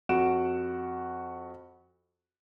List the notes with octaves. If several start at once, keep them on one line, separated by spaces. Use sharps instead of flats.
F2 F#4 F#5 D7 E7